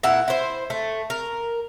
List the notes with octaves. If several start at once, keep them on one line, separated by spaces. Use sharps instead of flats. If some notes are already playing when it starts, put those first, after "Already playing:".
A#2 E4 F#5
E4 C5
A3
A#4